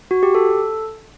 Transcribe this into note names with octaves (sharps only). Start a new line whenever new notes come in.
F#4
G4
A4